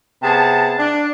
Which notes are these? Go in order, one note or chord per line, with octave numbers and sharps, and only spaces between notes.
C3 B3 G#4 A5
D4